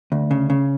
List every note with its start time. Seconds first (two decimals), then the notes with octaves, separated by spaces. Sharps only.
0.12 D2
0.31 C#3
0.50 C#3